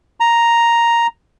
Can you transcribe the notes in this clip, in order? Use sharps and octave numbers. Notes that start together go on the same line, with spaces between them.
A#5